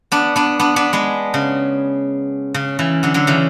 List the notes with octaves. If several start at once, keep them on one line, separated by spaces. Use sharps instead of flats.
B3 D4
B3 D4
B3 D4
B3 D4
G#3 B3
C#3
C#3
C#3 E3
D3 F#3
D3 F#3
C#3 E3